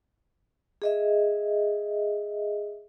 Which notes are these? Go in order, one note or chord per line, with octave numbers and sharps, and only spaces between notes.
G#4 D#5 E5